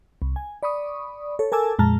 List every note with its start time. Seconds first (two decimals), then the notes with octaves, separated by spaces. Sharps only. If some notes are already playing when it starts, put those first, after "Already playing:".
0.22 C2
0.36 G#5
0.63 D5 B5 C#6 D#6
1.39 A4 C#5
1.52 A4 A#4 G#5 A5 D6 E6
1.79 F2 A#2 G#3 A5 A#5 F6